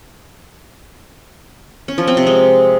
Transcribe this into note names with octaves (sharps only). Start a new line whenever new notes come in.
C#4
F3
C4
C3
G#3